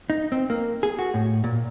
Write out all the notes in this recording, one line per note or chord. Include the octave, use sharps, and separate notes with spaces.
D#4
C4
A#3
G#4
F#4
A2
A#2